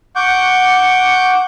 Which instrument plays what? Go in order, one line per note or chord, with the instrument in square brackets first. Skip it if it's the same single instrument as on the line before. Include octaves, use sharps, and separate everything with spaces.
[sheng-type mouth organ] F#5 C#6 D6 G6